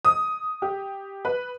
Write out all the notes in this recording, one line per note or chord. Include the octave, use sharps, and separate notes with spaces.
D#6
G4
B4